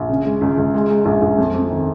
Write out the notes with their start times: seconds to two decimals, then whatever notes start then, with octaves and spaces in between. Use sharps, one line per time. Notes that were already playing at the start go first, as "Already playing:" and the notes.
Already playing: A#1
0.09 C#3
0.25 G#3
0.41 C#2
0.57 C#2
0.74 G#3
0.90 G#3
1.05 A#1
1.21 A#1
1.38 F2
1.54 F2
1.70 D#3